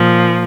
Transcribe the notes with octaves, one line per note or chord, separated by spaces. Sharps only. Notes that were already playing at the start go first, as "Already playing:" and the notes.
Already playing: A#2 F3